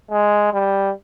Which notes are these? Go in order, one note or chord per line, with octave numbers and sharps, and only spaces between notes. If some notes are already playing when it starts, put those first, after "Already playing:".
G#3
G3